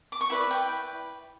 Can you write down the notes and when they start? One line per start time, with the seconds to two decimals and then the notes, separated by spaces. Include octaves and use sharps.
0.12 D6
0.21 C#6
0.30 E4 B4 D5 B5
0.51 G5